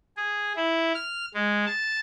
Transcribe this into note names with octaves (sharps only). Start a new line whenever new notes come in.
G#4
E4
F6
G#3
A5